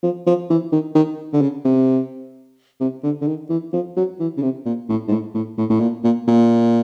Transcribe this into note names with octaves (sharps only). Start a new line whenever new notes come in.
F3
F3
E3
D#3
D#3
D3
C#3
C3
C3
D3
D3
D#3
E3
F3
F#3
E3
C#3
C3
A#2
A2
G#2
A2
A2
A2
A2
A#2
A#2
A#2